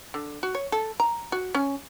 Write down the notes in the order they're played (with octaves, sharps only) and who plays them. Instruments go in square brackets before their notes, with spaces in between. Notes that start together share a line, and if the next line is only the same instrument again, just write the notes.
[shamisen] D3
F#4
C#5
A4
A#5
F#4
C#4